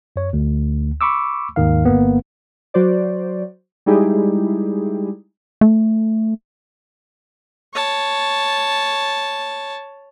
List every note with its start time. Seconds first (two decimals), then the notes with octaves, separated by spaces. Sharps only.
0.16 F#2 C#5
0.33 D2
1.01 B5 C#6 D6 E6
1.56 D#2 G#2 D#3 F5
1.85 G1 A#3 B3
2.74 F#3 F#4 C5 D5
3.86 G3 G#3 D#4 E4 G4 G#4
5.61 A3
7.74 C#5 A5